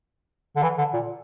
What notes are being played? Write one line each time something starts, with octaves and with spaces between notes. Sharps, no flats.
D3
E3
D3
A#2